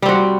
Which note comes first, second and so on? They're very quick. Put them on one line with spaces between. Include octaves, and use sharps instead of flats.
G3 C4 F#4